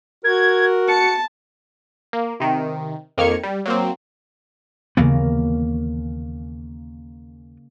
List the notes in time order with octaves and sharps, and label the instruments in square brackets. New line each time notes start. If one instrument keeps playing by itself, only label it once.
[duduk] F#4 [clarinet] A#4 [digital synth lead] G#6
[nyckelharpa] A5 [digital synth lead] C#7
[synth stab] A#3
C3 D#3
F2 D#3 A#3 F6 G#6 C#7
G3
F#3 A#3 C4
[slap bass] D#2 E3 B3 [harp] C#3 A#3